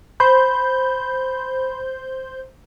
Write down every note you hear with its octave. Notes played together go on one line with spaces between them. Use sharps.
C5 B5 G6